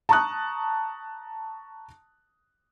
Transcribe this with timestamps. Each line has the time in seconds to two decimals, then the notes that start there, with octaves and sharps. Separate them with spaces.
0.09 A5 A#5 C#6 D#6 F#6